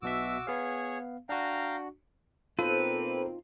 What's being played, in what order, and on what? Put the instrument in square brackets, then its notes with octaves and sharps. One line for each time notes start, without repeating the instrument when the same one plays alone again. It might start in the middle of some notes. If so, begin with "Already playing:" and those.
[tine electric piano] B1 B2 E5 [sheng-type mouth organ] F#4 D6 E6
[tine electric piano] B3 F5 [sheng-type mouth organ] G#4 C#5
[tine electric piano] D4 F#4 [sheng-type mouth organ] F5 G5 A#5
[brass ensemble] B2 A#3 C4 [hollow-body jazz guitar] D#4 F4 [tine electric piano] A4 C5 [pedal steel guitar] B4